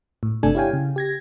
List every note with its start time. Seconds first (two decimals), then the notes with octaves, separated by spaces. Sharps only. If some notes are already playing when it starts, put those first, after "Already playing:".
0.23 A2
0.43 G1 C3 A3 D4 A4 G#5
0.55 E4 G4 C#5 F5 G5 G#5
0.73 C#3
0.96 G4 G#6 A#6